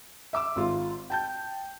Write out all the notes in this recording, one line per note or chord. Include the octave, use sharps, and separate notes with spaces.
E5 D6 E6
G#1 F4
G5 A5 G6